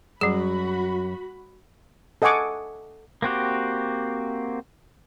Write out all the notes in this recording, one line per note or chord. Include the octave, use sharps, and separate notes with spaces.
F#2 G3 F#4 G#4 B5
A4 D#5 F#5 G#5 C#6 D6
A#3 C4 F#4 G4